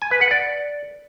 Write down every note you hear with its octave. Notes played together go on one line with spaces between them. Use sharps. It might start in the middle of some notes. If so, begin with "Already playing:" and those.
G#5
B4
F#5
D5